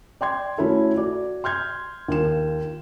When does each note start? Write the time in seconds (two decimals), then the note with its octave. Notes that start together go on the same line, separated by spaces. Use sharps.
0.21 D5 G5 C6 G#6
0.58 A3 C#4 E4 F#4 A4 E5
0.95 F#4 D5
1.44 C6 F6 G6 G#6
2.08 D#2 F4 E7